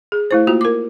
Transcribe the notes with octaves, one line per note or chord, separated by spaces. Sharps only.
G#4
A3 E4 C5
A#3 F4 F#4
A#4 D6